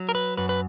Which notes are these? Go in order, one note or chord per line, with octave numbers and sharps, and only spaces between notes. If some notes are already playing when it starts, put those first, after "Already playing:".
Already playing: F#3
A#4
B4
F#2 B4
B4